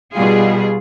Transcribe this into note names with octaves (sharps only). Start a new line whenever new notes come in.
B2 G3 F4 G#4